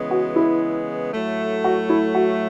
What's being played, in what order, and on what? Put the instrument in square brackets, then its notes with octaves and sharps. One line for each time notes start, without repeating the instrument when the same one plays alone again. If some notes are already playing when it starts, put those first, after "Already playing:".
Already playing: [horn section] C#3 E3 G#3 B3
[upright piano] F#4
E4
[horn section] A2 F#3 A3
[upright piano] F#4
E4
F#4